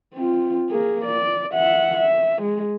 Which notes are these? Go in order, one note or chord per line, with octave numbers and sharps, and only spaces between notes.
C4 F4
A#3 G#4
D5
E5 F#5
E5
G#3